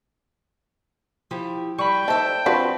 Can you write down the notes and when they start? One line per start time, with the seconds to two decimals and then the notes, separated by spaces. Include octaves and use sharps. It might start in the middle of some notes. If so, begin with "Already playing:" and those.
1.31 F3 E4 G4
1.78 G3 G5 B5 C#6
2.08 D#4 A4 C5 E5 A5
2.46 F3 C4 D4 F#4 B4